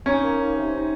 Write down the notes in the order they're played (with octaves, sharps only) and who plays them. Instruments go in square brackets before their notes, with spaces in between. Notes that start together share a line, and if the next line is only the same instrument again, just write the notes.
[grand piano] C#4 [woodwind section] D#4
[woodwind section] A#3
D#4
C3
D#4